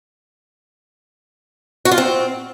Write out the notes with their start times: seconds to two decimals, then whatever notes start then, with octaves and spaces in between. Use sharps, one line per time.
1.85 F#4
1.91 F4
1.98 C4